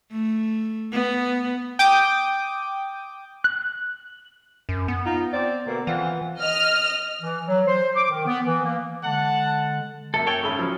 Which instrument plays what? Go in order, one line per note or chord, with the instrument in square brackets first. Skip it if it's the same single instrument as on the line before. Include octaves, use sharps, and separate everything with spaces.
[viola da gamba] A3
B3
[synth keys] G5 D6 D#6
[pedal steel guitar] F#6
[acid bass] F#2
B3
[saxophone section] D#4 F4
C4 D5
B2 D3 A#3
[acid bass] E3 [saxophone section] C4 F4 F#5
[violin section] D#5 F6
[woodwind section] E3
F#3
C5
D6
D#3
B3
E3
A#3
[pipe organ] D3 G#3 [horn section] F#5 A5
[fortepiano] F#2 A#3 E5 [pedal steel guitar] A4
[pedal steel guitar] A4 C#5 G5
[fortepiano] G#1 A4 B5 [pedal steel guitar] C#4
[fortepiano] F3 F#3